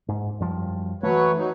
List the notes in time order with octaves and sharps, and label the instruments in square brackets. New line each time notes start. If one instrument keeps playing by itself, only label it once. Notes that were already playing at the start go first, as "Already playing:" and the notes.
[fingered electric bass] G#2
F#2 F3 G3
[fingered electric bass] E3 A3 [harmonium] F#3 B4 C#5
[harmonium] F#3 D#4